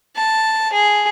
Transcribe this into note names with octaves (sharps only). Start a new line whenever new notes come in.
A5
G#4